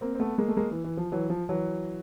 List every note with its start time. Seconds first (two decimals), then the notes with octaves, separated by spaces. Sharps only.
0.01 A#3 C4
0.15 C4
0.20 A3 B3
0.38 G#3 A#3
0.48 A3
0.57 G#3 A#3
0.71 E3
0.84 E3
0.97 F3
1.12 E3 F#3
1.30 F3
1.49 E3 F#3